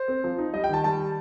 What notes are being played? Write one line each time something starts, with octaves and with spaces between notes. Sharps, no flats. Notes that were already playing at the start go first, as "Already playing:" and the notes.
Already playing: C5
C4
F3
D#4
G3 D#5
G5
D#3 A5
G3 A5